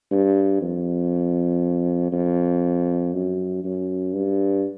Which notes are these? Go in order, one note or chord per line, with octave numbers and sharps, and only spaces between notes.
G2
F2
F2
F#2
F#2
G2